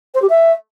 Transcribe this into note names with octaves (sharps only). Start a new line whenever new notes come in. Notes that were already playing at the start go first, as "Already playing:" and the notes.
C5
G4
E5